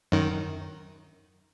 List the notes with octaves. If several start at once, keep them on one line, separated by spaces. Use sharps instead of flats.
F#2 D#3